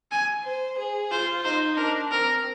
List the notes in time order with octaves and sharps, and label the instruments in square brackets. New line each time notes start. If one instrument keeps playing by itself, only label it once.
[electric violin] G#5
[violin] C5
G#4
[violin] F4 [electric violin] C5
[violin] D#4 [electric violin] C5
[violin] D4 [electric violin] A#4
[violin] C4 [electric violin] A#4